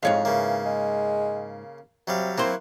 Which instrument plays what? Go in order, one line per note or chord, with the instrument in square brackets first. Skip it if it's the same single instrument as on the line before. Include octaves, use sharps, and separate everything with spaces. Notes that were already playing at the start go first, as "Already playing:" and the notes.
[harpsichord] F2 [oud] G#2 C#5 F5 [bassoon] G#3
[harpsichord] C#3 A#3 [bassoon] E3
[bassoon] G#3
[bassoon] C3 [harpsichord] F#3 G3 F5
[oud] F#3 C5 [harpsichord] A#3 E4 [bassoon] C4